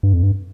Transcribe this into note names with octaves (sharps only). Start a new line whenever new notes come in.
G2
F2
G2